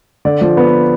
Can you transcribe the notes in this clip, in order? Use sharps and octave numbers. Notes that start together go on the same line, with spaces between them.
D3 D5
F3
B3